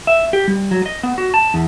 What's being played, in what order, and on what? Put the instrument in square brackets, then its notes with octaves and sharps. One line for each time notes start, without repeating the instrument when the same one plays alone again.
[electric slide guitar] E5
G4
G3
F#3
D#5
B3
F#4
A5
E2